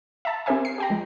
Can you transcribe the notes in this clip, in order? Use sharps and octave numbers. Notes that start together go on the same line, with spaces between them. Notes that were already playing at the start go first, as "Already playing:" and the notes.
E5 A5
C4 G4 A#4 C5 E5 G#5
C7
G4 G5 A#5
F3 G#3